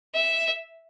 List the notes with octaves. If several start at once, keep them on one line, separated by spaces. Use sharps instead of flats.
E5